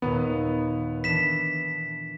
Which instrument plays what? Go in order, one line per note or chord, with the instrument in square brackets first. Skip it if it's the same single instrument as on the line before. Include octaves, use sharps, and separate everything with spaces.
[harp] D#2 A#2 [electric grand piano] B3
[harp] E3 D4 [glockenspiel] B6 E7